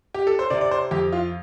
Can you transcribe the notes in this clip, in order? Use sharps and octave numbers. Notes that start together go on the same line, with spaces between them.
G4
A4
C5
C3 D5
D5
C5
F2 G4
F4